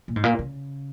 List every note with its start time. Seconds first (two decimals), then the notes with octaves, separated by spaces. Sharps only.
0.08 A#2
0.16 G#2
0.24 A#2
0.39 C#3